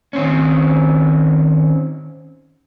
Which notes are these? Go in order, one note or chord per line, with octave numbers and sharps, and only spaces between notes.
D#3 C4 C#4